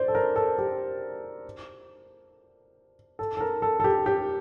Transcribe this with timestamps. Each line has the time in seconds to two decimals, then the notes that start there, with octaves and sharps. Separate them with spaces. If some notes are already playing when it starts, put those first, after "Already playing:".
Already playing: C5 D5
0.08 A4
0.15 A#4
0.36 A4
0.58 G4
3.19 A4
3.37 A4
3.41 A#4
3.62 A4
3.80 A4
3.84 G4
4.06 G4